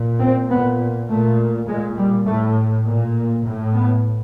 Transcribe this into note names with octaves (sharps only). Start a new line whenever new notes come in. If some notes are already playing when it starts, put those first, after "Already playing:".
Already playing: A#2
C4
A#2 B3
A#2 A3
A#2 G#3
G3
A2 A3
A#2
A2
B3